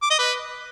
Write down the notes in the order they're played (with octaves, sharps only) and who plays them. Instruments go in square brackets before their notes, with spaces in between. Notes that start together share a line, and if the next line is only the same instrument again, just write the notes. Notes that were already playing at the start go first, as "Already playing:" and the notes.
[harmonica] D6
D#5
B4